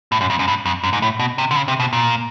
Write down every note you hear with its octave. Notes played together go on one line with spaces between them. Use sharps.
A2
F#2
F2
F#2
G2
F2
F#2
G#2
A2
B2
C3
D3
C#3
C3
B2
A#2